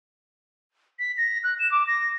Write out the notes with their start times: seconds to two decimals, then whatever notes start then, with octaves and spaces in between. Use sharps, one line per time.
0.99 B6
1.17 A#6
1.44 F#6
1.60 E7
1.72 D6
1.87 A#6